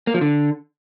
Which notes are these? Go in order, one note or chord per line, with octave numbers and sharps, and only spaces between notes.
A#3
F3
D3